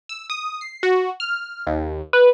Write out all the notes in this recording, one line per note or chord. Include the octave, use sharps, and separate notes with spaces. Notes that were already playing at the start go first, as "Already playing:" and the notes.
E6
D#6
C7
F#4
F6
D#2
B4